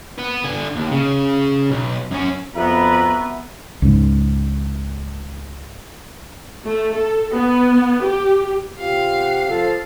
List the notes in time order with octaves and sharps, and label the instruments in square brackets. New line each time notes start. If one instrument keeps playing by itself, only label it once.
[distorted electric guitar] B4 F#5
D3 G#5
D#2
C#3
B1
F#2 C#4
[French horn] F2 [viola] B3 B4 [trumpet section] F#4 E5 [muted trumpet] A#5
[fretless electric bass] C#2 G#2
[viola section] A3
A4
B3
G4
[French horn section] C3 F4 G4 [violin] F5
[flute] F#5
[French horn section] F3 [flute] A4